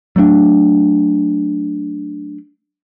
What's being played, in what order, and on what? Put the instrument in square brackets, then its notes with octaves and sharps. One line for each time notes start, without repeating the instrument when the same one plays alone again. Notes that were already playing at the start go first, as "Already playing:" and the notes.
[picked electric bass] F#3 A3 B3 D4